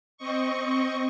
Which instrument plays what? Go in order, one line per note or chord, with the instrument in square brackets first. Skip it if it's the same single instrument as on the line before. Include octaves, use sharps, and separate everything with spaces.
[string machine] C4 D#5 C#6